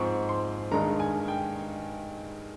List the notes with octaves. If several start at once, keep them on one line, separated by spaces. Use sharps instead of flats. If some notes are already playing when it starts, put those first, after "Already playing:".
Already playing: G#2 F3 C4 C#6
C6
G2 D#3 G#3 D#4 A#5
G#5
G5